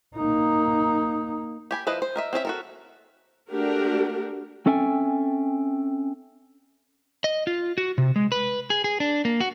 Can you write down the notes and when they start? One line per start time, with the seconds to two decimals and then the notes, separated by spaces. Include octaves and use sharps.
0.16 A#3 D#4
1.71 G4 G#5 B5
1.87 F3 E4 B4 C5 D#5
2.02 C5
2.16 A#4 D#5 E5
2.33 C4 C#4 A#4 E5
2.45 F#4 A4 A#4
3.50 A3 D4 F#4 G4 A#4
4.66 C4 C#4 A4 E5 G5 G#5
7.24 D#5
7.47 F4
7.78 F#4
7.98 C3
8.16 G#3
8.32 B4
8.70 G#4
8.84 G#4
9.00 D4
9.25 A#3
9.40 F#4